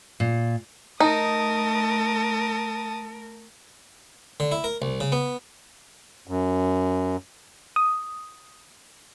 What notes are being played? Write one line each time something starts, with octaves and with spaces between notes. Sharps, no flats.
A#2
A3 D#4 A#4 A5 D#6
D3
E4
A#4
C2
C#3
B3
F#2
D#6